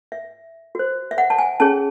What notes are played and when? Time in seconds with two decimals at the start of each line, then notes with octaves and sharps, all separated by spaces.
0.12 E5
0.75 F#4 C5
1.11 E5
1.18 F#5
1.30 A5
1.38 G#5
1.60 C#4 G#4 C#5 A5